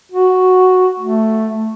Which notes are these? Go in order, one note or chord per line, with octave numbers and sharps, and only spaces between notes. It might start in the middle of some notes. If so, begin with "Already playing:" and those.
F#4
A3